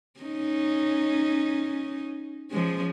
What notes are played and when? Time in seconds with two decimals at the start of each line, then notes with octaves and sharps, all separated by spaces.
0.20 C#4 D#4
2.50 F3 G#3 C#4